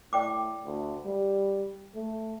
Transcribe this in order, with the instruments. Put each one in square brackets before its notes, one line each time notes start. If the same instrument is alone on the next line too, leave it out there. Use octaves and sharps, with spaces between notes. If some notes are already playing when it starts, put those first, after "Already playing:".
[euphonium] A2 [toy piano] D5 G5 D6
[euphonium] D2
G3
A3